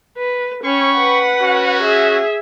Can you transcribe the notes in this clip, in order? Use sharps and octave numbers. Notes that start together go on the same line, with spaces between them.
B4
C#4 G5 B5 C#6
B4 F#5
C#4 F#4
G#4 E5